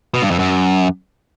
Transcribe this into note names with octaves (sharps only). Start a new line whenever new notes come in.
B2
G2
F2
F#2